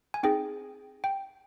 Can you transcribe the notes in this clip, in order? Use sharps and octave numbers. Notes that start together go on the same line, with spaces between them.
G#5
C4 D#4 G#4 G5
G5